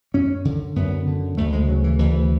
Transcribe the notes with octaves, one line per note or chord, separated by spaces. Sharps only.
F#2 C#4
D3
F#2 B3
D3
D2 A3
G#3
C#3 F#3
E3
D2 E3